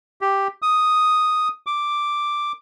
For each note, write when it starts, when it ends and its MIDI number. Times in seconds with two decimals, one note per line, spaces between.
0.21 0.48 67
0.62 1.48 87
1.67 2.52 86